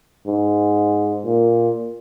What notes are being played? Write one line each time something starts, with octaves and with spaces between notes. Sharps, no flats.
G#2
A#2